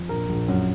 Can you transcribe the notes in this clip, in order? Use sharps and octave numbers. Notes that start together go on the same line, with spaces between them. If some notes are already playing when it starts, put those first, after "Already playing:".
Already playing: F2
A#1 A#4
A#1
F#2